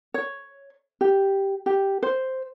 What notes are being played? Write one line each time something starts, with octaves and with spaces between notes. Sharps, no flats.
C#5
G4
G4
C5